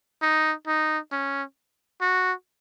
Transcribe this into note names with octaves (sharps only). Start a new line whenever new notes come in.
D#4
D#4
C#4
F#4